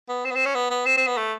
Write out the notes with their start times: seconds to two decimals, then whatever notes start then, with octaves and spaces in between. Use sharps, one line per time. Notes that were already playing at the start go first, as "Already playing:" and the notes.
0.09 B3
0.25 C4
0.31 B3
0.36 C4
0.46 C#4
0.55 B3
0.70 B3
0.86 C4
0.97 C4
1.07 B3
1.17 A3